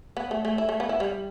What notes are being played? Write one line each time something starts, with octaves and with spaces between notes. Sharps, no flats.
B3
A3
A3
E4
A3
B3
E4
G3